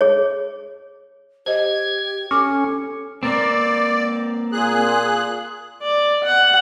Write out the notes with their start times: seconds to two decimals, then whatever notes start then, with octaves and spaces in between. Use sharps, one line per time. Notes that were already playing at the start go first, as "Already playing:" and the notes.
0.01 G#4 C#5
1.46 G4 C5 D#5 G#6
2.31 C#4 A4 D6
3.23 A#3 C4 D5
4.53 A#2 G#4 F#6
5.82 D5
6.24 F#5